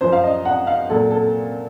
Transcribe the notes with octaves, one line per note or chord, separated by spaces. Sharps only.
F#2 F3 C5
F5
D#5
F#5
F5
A#2 F#3 A4
A4